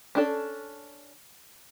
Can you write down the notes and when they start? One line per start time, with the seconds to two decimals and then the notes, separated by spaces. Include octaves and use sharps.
0.15 C#4 D4 A4